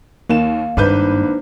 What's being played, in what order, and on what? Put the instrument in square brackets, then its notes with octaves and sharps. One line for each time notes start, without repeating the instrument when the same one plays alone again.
[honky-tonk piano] D#2 E7 [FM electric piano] A#3 [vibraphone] F5
[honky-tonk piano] G#1 B4 G6 [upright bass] G2 [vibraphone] D4 C5